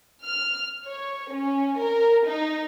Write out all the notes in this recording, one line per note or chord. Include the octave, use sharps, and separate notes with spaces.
F6
C#5
C#4
A#4
D#4